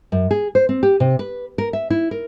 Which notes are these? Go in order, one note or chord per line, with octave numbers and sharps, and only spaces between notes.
F#2
G#4
C5
C4
G4
C3
B4
A#4
E5
E4
A#4